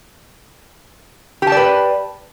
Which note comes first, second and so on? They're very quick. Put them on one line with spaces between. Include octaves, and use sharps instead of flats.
G4 A5 D5 B4